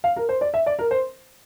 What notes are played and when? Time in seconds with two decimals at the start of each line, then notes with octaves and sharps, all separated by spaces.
0.04 F5
0.16 A#4
0.29 C5
0.41 D5
0.54 E5
0.66 D5
0.79 A#4
0.91 C5